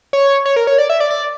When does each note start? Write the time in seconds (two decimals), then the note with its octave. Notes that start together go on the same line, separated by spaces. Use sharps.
0.13 C#5
0.46 C#5
0.56 A#4
0.67 C#5
0.78 D5
0.90 E5
1.00 D5
1.11 D5